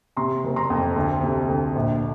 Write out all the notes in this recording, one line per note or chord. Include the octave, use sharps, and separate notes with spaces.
C3 A#5 C6
F#1
A#5 C6
F2
D2
C3
D2
A#1